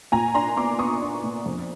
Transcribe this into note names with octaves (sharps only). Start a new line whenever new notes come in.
A#2 G#5 A#5
D4 A#5 C6
B3 C6 D6
B3 C#6 D#6
D4
A#2
F2